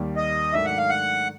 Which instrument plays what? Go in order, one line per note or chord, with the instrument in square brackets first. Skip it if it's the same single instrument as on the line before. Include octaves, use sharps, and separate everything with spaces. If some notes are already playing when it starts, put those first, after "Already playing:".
Already playing: [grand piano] D#2 D#3 G3
[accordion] D#5
[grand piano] G#2 D#3 F#3 A3 D4 [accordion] E5
[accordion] F#5
F5
F#5